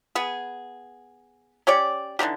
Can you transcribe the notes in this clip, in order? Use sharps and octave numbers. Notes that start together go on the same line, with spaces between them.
B3 G#4
C#4 G4 C#5 D5
D3 E3 D#4 G4